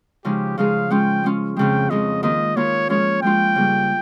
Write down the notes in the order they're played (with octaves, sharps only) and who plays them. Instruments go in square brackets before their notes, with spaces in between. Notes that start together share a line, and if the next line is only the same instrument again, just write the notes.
[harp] C#3 F3 G#3 D#4 G#4 [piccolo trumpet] G4
[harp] C#3 F3 G#3 D#4 G#4 [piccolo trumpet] F5
[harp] G#3 C#4 F4 [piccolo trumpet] G5
[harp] G#3 C#4 F4
[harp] F2 C#3 G#3 [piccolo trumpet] G5
[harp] F2 C#3 G#3 [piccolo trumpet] D#5
[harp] D#3 A#3 F4 [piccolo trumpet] D#5
[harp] D#3 A#3 F4 [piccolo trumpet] C#5
[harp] F3 G#3 C#4 F4 [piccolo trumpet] C#5
[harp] F3 G#3 C#4 F4 [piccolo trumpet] G5
[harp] C#3 G3 A#3